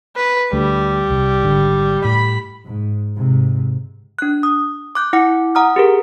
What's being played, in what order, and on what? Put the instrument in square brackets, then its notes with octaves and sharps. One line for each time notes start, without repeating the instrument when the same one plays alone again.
[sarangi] B4
[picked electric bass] D2 A3 D4 [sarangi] G3
[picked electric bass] C2
G#1 D3
[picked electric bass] A2 [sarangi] B5
[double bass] G#2
G#2 C3
[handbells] D4 F#6
D#6
D6 F#6 G6
E4 F#5 D6 C#7
F#5 A#5 D#6 F6
G4 G#4 A#4